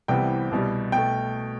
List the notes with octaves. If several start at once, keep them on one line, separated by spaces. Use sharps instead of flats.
C2 C3 E3 G3 B3 G5
C2 B2 G3
B2 A3 G5